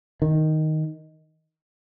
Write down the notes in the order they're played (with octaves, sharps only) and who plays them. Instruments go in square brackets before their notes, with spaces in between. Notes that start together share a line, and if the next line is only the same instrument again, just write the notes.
[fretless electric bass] D#3